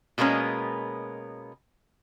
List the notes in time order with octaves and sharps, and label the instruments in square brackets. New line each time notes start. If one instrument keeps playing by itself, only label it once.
[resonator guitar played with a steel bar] B2 G#3 A#3 B3 C#4